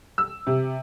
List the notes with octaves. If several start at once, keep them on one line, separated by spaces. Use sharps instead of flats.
E6
C3